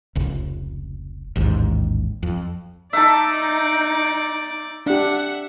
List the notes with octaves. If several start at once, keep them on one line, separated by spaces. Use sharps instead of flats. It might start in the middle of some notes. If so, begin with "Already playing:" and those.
F1 C#2
A1 D#2 G#2
F2
D#4 D5 E5 A5 D6
D4 G4 E5 F#5